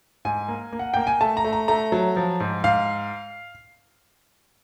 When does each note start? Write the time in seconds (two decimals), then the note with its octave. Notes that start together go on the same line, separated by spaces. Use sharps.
0.25 G#2 G#5
0.48 A#3
0.73 A#3
0.79 F#5
0.94 A#3 G5
1.07 G#5
1.21 A3 A5
1.37 A#5
1.45 A3
1.53 A#5
1.68 A3 A#5
1.92 F#3
2.16 F3
2.40 G#2
2.64 G#2 F5